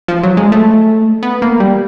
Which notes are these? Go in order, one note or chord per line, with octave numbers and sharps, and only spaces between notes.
F3
F#3
G#3
A3
B3
A#3
G3